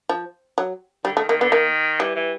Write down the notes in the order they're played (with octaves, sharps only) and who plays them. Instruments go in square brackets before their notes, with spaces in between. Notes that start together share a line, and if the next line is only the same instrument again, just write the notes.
[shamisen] F3
F#3
[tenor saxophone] D3 [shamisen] G3
[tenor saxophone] D#3 [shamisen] A3
[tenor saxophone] D#3 [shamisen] A#3
[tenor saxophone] D3 [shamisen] B3
[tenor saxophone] D#3 [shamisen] A#3
[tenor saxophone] E3 [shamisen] G3
[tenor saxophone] E3